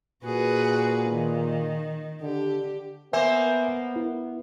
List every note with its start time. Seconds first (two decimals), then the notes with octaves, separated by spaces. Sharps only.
0.25 A#2 F#4 G#4 B4
1.10 D#3
2.22 D3 G4
3.13 A#3 B3 C5 E5 G#5
3.96 E4